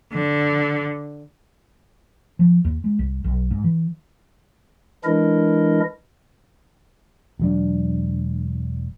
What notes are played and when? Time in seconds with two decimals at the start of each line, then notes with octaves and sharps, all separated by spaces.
0.12 D3
2.39 F3
2.65 D#2
2.84 G#3
2.99 C2
3.24 B1
3.51 G#2
3.64 E3
5.04 E3 G#3 D4 E4 A#4 D#5
7.39 E1 F#3 D4